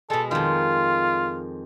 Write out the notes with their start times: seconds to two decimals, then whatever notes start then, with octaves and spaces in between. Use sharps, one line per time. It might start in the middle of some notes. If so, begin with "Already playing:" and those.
0.10 B2 G#3 A4
0.31 F2 D#3 F4